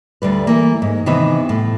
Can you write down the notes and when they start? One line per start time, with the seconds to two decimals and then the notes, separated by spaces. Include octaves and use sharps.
0.22 D2 D3 G3 B4
0.47 E3 A#3
0.82 G#2
1.06 C3 D#3 E3 B3 E5
1.49 A2